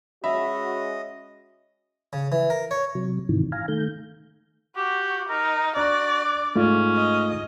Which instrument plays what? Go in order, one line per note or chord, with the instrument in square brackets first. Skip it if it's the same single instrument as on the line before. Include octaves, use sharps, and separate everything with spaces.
[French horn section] G#3 C#4 F#4 [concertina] D#5 [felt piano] E5 [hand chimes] B5
[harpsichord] C#3
E3
A#4
C#5
[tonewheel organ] C3 F#3
G#2 C3 D#3 E3
F5 G#5 A#5
D#3 A3 G6
[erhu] F#4 [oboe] G4
[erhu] D#4 [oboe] A#4
[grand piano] D4 [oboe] F#4 [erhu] D5
[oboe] D6
[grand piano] G#2 [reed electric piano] A3 F4 [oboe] C#4
[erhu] D#5